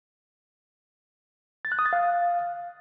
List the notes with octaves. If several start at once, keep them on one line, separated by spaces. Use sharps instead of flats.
A6
F#6
D#6
A6
F5